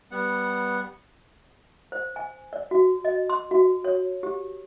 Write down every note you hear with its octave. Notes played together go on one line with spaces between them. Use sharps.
G3 B3 F#5
C5
G#5
D5
F#4
D#5
C6
F#4
C#5
G4